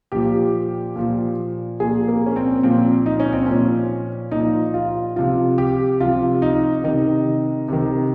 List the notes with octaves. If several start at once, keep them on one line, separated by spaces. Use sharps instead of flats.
A#2 F3 G4
A#2 F3
A#2 F3 G#4
A#3
C#4
C4
A#2 F3 C4
D#4
C#4
C4
A#2 F3 C#4
A#2 F3 D#4
F4
C3 F3 F4
G4
C3 F3 F4
D#4
C3 D#3 D#4
C3 D#3